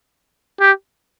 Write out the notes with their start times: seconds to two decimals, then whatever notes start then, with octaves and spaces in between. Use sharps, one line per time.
0.60 G4